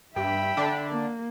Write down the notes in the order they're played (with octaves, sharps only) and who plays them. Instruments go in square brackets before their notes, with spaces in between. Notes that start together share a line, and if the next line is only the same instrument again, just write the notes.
[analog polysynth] G2 [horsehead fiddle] E5 B5 [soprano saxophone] G5
[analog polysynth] D3 D4
[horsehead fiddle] A#3